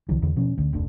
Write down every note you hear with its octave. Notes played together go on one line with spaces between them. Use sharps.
C2 D3 E3 F#3
E2 D3
B2 F3 C#4
D2 D3
F1 D2 D3